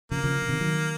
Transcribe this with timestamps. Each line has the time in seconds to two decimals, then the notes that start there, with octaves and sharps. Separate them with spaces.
0.11 C#3 F3 A#3
0.24 C#3 F3
0.42 C#3
0.48 C3 D#3
0.60 D#3 F#3